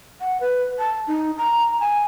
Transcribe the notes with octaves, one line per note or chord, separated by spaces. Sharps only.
F#5
B4
A5
D#4
A#5
G#5